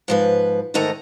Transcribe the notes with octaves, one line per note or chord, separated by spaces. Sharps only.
G#2 F3 B4
G#2 D3 D#3 A3 D#5 A#5